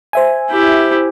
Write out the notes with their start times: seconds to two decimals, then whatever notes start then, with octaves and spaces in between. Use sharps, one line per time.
0.13 C5 E5 G#5
0.51 E4 G4